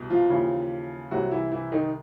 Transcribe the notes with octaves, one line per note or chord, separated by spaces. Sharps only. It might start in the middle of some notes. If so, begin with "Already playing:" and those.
Already playing: C2 B2
F3 F4
D#2 C#3 E3
C2 C3 E3 F#3 F#4
E3 E4
E3 E4
D#3 D#4